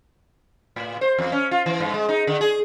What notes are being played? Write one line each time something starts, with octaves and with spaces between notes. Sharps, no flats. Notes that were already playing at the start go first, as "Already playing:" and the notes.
A2
C5
E2
C#4
F4
E3
G2
G#3
D#4
D3
G#4